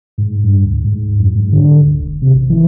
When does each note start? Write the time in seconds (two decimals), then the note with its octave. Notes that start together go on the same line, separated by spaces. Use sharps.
0.18 G#2
0.44 G2
0.65 D2
0.84 G#2
1.19 F#2
1.35 G#2
1.52 D3
1.86 C#2
2.02 E1
2.22 C3
2.34 G#1
2.49 E3